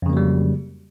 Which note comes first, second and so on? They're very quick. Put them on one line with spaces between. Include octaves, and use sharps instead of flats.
F2 C#3 A#3 F#3 G3